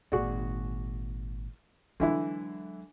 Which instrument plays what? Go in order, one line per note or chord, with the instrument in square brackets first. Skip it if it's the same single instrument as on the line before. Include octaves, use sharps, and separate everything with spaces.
[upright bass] G#1 A#2 [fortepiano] F#4 G#4 D5
[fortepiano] D3 E3 E4 [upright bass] F#3 G#3